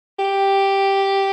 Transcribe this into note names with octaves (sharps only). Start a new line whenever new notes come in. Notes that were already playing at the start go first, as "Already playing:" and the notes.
G4